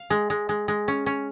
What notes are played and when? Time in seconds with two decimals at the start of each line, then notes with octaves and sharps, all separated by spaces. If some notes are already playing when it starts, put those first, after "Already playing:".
Already playing: F5
0.10 G#3
0.30 G#3
0.49 G#3
0.68 G#3
0.88 C#4
1.06 C#4